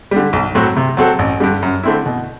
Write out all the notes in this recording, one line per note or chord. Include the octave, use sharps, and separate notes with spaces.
D3 G3
B1
A2 F#3 C4 F#4
C3
F#3 C4 F#4 A4
A1
G2 D3 G3
F#2
D3 A3 C4 E4
B2